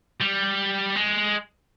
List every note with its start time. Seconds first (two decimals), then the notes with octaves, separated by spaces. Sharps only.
0.21 G3
0.96 G#3